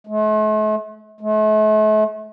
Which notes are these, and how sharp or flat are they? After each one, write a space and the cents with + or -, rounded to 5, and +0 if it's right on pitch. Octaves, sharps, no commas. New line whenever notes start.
A3 -45
A3 -40